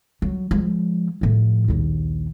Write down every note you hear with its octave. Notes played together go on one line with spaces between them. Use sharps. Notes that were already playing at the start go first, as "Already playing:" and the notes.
F#3
F3 G#3
A2 F3
A#1 D#2